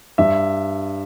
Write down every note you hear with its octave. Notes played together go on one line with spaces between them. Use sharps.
G2 E5